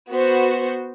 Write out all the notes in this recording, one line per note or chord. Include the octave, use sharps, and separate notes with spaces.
B3 F#4 C5